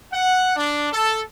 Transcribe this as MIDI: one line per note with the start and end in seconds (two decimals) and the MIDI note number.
0.13 0.54 78
0.56 0.92 62
0.93 1.21 69